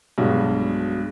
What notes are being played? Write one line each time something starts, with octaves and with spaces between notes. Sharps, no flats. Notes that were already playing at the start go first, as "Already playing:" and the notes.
B1 G2 B2 G#3